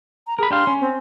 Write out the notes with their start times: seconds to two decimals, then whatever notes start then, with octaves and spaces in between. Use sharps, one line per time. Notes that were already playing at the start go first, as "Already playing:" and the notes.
0.27 A#5
0.39 G#4 A#4 B5
0.51 D4 G4 F5 C6
0.67 C#4
0.81 C4